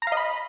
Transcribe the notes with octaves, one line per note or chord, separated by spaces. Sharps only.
A#5
F5
D#5
B5